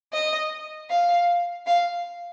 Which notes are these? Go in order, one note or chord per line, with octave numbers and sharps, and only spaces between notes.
D#5
F5
F5